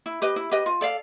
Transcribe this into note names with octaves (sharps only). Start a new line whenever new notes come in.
E4
G4 B4 D#5
E4
G4 B4 D#5
F4
A4 D5 F5